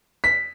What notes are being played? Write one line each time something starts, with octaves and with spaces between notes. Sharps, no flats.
B6